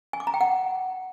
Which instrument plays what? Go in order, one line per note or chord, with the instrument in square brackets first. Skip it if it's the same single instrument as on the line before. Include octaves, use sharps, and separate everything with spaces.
[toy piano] G#5
D6
A#5
G5
F#5